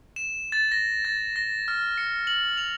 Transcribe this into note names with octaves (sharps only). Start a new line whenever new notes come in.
E7
A6
A#6
A6
A#6
F6
C#7
F#7
F7